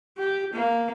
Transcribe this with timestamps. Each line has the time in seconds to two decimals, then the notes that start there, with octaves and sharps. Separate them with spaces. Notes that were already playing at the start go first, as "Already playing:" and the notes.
0.18 G4
0.54 A#3